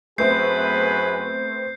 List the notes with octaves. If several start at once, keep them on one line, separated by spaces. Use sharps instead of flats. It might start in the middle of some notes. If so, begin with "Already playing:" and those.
F#2 A3 B3 C4 G#4 B4 G6 C7